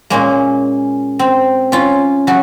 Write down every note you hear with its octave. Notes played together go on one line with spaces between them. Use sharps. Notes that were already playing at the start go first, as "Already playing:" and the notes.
A#2 G#3 A#3 C#4
C4
C#4 F4
C#3 F#3 F#4